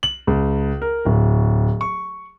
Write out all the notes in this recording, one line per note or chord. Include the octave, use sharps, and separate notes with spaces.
F#7
C#2
A#4
D1
C#6